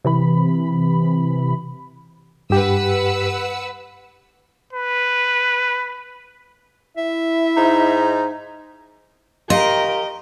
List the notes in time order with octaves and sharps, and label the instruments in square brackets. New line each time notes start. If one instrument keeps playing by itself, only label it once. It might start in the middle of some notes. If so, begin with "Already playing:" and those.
[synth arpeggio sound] C3 E3 B5
[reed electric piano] G2 G4 [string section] B4 F#5 E6
[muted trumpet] B4
[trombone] E4 [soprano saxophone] E5
[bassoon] G#2 [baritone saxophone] D#4
[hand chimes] G4 F5 C6 [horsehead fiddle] A#4 G5 [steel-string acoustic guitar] D#5